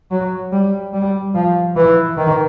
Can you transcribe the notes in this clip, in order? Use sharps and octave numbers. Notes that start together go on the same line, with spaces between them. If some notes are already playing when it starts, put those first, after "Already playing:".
F#3
G3
G3
F3
E3
D#3